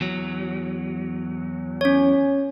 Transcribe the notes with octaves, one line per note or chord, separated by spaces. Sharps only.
E2 F#3
C#4 C#5